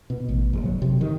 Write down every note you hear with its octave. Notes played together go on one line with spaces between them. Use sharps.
B2
A1
F#1
F#3
C3
D#3